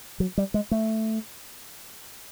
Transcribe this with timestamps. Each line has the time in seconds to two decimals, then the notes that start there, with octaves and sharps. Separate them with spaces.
0.20 F#3
0.38 G3
0.54 G#3
0.71 A3